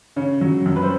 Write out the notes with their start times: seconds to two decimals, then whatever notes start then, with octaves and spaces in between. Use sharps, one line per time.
0.16 C#3 C#5
0.41 F#3
0.66 F#2
0.76 B4
0.83 C5